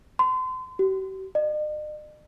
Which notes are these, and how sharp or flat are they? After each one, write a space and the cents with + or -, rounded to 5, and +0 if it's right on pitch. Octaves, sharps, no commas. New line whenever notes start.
C6 -35
G4 -45
D#5 -45